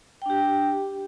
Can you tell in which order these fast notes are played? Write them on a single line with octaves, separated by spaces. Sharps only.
G5 D4 G4